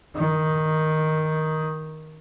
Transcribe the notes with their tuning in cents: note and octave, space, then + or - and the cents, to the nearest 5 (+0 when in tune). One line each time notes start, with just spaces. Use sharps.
D#3 +5